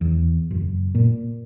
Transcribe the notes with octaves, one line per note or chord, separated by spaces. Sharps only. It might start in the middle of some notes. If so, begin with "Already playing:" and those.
E2
F#1
A#2